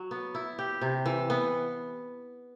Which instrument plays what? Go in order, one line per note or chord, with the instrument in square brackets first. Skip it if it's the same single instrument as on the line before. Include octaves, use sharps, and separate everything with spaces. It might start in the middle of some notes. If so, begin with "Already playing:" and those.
Already playing: [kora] F#3
B3
E4
G4
C3
E3
B3